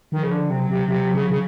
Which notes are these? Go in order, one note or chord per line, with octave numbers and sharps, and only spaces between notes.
D#3 F3
C#3
D3
C3 F#3
C3
C3
C#3
C#3